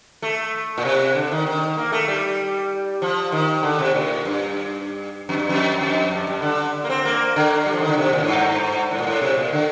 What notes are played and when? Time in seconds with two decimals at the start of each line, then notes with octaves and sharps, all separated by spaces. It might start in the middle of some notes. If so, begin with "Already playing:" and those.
0.22 A3
0.78 A#2
0.85 C3
1.15 D3
1.32 D#3
1.47 D#3
1.77 A#3
1.92 A3
2.08 G3
3.02 F3
3.32 D#3
3.63 D3
3.79 C3
3.94 A#2
4.25 G2
5.29 F2
5.35 G2
5.49 F2
5.81 F2
6.11 G2
6.27 G2
6.42 D3
6.84 A#3
6.89 C4
7.05 A#3
7.36 D3
7.66 G3
7.73 F3
7.81 D#3
7.89 D3
7.98 C3
8.13 A#2
8.23 A2
8.28 G2
8.91 A2
8.98 A#2
9.07 A2
9.21 C3
9.38 A#2
9.53 D3